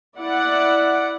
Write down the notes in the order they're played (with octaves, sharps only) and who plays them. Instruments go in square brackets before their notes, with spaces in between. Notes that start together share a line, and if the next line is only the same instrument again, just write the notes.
[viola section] E4 D5 F#5